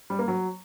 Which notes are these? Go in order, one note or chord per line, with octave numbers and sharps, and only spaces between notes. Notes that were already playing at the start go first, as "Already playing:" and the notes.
G3
A#3
F#3